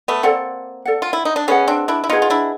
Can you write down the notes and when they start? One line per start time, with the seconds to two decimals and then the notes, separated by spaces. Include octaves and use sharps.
0.08 A3 B3
0.23 A#3 C4 A4 D5 F#5
0.85 A4 D5 F#5
1.02 F4
1.13 E4
1.25 D#4
1.36 D4
1.48 B3 C#4 G#4 B4 D#5 F#5
1.68 C4 D4
1.88 D4 E4
2.04 E4
2.09 D#4 F4 G#4 B4 D#5 F#5
2.22 F4
2.30 D4 E4